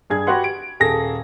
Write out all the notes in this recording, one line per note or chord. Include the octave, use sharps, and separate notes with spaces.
G2 G#4 G#6
F#4 G4 B4 F#5 C6
D7
D#1 G#4 A4 A#6